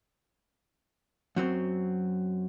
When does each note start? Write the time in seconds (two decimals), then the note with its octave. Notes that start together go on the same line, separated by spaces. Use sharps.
1.36 F#2 F#3 C4